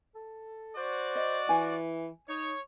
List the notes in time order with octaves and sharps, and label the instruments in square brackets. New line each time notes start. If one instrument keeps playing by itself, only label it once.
[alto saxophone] A4
[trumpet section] F#4 D5 [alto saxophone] C5
[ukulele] D#5
[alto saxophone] E3 [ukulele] G#5
[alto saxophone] D#4 [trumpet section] C#5